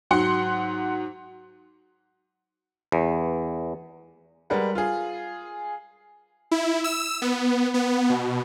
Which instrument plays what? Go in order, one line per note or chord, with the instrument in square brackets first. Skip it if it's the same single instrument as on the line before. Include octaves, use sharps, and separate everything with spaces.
[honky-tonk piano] G#2 F#3 F#5 C6 C#7
[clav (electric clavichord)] E2
[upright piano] G3 G#3 A#4 B4 F#5
F4 G#4
[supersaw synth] E4
E6
B3
B3
B2